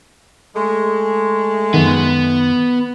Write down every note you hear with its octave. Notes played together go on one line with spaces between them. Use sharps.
G#3 A3
F#2 D#3 B3